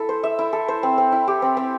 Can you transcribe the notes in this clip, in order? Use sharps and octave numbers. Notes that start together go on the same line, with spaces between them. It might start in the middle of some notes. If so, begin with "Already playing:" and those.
Already playing: E4 A4
C5
E5
E4
A4
C5
C4
C4
E4
G4
C4
C4